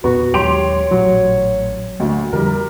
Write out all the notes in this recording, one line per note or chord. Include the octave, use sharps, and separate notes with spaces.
E2 A#2 B3 F#4
D#2 F#3 G#3 G4 C#5 C6 D7 F7
A1 A#2 F#3
D2 A#3
F2 D3 F3 G3 A#4